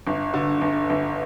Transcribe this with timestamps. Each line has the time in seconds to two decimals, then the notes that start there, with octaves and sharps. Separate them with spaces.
0.07 G1
0.34 D3
0.61 G1
0.90 G1